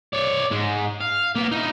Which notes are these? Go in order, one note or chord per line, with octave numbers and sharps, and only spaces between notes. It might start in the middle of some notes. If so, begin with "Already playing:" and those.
C#5 D5
G#2 G#3
F5
A#3 B3
D#4 E4